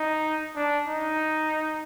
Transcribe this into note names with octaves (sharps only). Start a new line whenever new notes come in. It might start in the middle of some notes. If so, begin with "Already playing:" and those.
Already playing: D#4
D4
D#4